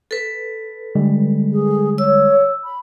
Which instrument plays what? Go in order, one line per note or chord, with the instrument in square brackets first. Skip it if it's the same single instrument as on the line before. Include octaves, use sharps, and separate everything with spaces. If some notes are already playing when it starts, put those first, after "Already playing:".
[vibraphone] A4 B4
[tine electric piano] D3 G3 G#3
[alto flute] G#4
[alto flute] C#5 [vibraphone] E6
[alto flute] B5